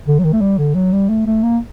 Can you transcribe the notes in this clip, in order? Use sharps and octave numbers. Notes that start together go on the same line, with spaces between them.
D3
F#3
D#3
A3
G3
D3
F#3
G3
A3
A3
A#3